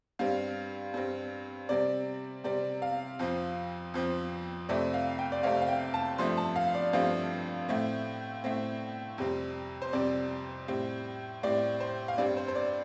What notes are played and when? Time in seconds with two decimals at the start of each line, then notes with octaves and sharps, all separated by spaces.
0.19 G2 G3 C4 F5
0.94 G2 G3 C4
1.69 C3 G3 C4 D5
2.44 C3 G3 C4 D5
2.82 F5
3.19 F2 F3 C4
3.94 F2 F3 C4
4.69 F2 C3 A3 C4 D5
4.94 F5
5.19 G5
5.32 D5
5.43 F2 C3 A3 C4 F5
5.62 F5
5.69 G5
5.94 A5
6.18 G2 F3 A3 C4 C6
6.37 A5
6.56 F5
6.75 D5
6.93 G2 F3 A3 C4 F5
7.69 A2 A3 C4
8.44 A2 A3 C4
9.18 F2 C3 G3 C4
9.82 C5
9.93 F2 C3 G3 C4 D5
10.68 A2 G3 C4
11.43 A2 G3 C4 D5
11.80 C5
12.08 F5
12.18 G2 G3 C4 D5
12.37 C5
12.48 C5
12.55 D5